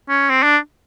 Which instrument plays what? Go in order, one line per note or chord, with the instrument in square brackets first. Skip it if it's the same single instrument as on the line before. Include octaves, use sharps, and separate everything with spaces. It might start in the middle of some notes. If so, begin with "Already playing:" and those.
[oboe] C#4
C4
D4